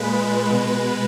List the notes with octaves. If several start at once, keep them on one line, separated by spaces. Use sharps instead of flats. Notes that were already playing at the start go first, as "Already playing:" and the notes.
Already playing: A#2 G#3 B4
B2 G#3